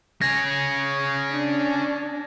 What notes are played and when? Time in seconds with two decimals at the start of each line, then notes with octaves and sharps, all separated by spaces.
0.21 C#4 G#4 G#6 A#6
1.31 D4